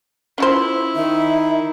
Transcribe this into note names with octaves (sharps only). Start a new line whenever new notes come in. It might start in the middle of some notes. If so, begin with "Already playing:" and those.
C#4 E4 F4 C5
D#3 D#4 E5